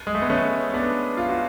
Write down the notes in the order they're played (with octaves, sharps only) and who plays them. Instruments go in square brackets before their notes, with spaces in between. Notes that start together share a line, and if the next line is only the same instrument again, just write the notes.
[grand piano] G#3
A3
B3
A3 C#4
B3 D4
F4
F#4